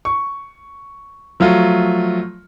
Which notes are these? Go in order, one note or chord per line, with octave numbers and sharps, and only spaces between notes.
C#6
F3 F#3 A3 F4